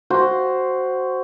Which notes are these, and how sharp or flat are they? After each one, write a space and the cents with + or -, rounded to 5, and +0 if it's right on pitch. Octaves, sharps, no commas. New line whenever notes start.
F#4 +10 C5 +0